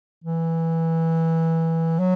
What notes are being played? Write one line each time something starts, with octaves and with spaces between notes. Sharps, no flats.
E3
F#3